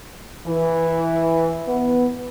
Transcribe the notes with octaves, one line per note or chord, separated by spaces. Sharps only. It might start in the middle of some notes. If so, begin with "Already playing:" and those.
E3
B3